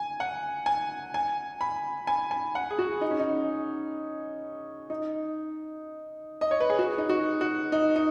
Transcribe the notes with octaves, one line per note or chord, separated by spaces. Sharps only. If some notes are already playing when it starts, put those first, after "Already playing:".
Already playing: G#5
F#5
G#5
G#5
B5
G#5
G#5
F#5
G#4
F#4
D#4
C#4
D#4
D#4
D#5
C#5
B4
G#4
F#4
D#4
F#4
F#4
D#4
D#4